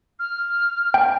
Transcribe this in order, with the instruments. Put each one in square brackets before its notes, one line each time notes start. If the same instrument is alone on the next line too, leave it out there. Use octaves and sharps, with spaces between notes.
[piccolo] F6
[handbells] G5